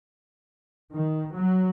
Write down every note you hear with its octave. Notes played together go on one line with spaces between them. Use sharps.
D#3
F#3